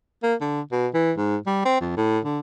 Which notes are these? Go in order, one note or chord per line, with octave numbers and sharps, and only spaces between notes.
A#3
D3
B2
E3
G#2
G3
C4
F2
A2
D3